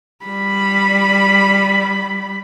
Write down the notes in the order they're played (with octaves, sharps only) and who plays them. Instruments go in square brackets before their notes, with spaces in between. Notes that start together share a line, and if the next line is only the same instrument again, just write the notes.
[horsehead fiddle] G3 B5